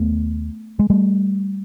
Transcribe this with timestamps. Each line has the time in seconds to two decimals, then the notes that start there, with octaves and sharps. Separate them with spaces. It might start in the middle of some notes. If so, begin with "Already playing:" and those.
Already playing: D#2 A3 B3
0.79 G#3
0.90 G3 A3